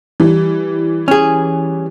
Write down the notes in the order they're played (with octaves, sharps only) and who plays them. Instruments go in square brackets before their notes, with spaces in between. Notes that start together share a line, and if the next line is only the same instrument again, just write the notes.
[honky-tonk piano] E3 G3
[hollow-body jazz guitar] C#4 G#4